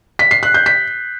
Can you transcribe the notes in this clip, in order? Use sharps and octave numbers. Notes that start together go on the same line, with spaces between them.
B6
C7
F#6
G6
B6